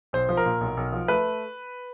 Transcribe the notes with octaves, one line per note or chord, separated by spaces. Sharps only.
B1 C5
F3
A#4
A#2
B1
B1
F3
A3 B4